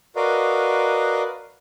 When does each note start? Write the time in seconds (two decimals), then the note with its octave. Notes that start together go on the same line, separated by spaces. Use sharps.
0.16 F#4 A#4 B4 D5 D#5 F5